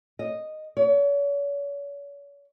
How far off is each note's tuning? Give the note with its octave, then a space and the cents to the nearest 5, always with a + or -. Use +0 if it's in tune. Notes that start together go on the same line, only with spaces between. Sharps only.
D#5 -5
C#5 +40